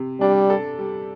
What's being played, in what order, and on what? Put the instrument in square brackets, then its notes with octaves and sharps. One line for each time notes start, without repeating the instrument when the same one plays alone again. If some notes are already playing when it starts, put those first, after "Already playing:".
Already playing: [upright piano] C3
[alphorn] G3 [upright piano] D4
[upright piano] A4
G3